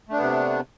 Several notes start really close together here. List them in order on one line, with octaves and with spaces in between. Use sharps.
A3 D4 B3 C3